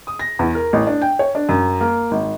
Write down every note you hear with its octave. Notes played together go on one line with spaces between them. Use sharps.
D#6
A#6
E2
A#4
A1
D4
G5
C#5
D4
F#2
A#3
G#1